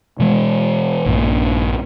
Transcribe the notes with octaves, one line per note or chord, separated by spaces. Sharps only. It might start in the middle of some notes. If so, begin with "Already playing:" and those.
B2 E3 G#3
A#1 G2 A#3